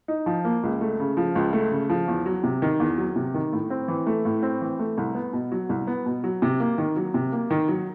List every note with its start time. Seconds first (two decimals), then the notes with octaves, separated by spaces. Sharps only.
0.08 D#4
0.26 F3
0.45 A#3
0.63 C#2
0.81 A3
0.99 C#3
1.17 F3
1.35 C#2
1.53 A3
1.71 C#3
1.90 F3
2.08 E2
2.26 F#3
2.44 C3
2.62 D#3
2.80 E2
2.98 F#3
3.16 C3
3.34 D#3
3.53 A2
3.70 C4
3.88 E3
4.07 A3
4.25 A2
4.43 C4
4.61 E3
4.79 A3
4.97 C2
5.15 B3
5.33 B2
5.52 F#3
5.69 C2
5.87 B3
6.06 B2
6.24 F#3
6.42 C3
6.60 A#3
6.78 D#3
6.96 F#3
7.14 C3
7.32 A#3
7.50 D#3
7.68 F#3